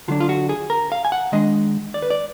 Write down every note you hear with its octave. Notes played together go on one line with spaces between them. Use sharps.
D3 F#3 D4 F4
F4
F#4
G#4
A#4
F5
G#5
F#5
D#3 G#3 D4 D#5
D5
B4
D5